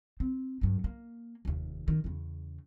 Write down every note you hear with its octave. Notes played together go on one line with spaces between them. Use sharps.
C4
G2 F#3
A#3
F1 D#2
D#3
E2 C#3